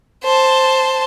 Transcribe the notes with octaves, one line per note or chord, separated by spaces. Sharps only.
C5 A5